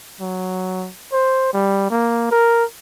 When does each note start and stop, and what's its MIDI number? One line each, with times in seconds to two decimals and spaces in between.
0.21 0.89 54
1.12 1.51 72
1.53 1.86 55
1.90 2.29 58
2.31 2.64 70